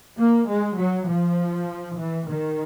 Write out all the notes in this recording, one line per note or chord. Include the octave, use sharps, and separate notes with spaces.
A#3
G#3
F#3
F3
E3
D#3